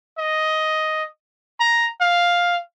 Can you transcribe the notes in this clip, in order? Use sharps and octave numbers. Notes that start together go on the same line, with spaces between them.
D#5
A#5
F5